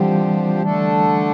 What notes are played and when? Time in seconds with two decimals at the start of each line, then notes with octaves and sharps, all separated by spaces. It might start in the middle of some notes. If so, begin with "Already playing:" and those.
Already playing: D3 E3 F3 G3 C4 G4
0.62 D3 A3 D4 A4